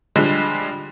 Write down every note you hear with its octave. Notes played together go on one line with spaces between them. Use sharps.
D3 F3 G3 G#3